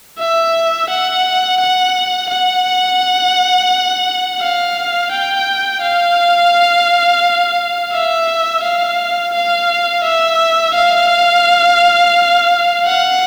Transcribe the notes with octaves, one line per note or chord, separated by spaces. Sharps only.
E5
F#5
F#5
F#5
F5
G5
F5
E5
F5
F5
E5
F5
F#5